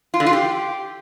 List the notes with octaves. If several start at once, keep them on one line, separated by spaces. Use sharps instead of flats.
F4
D3
F4
G4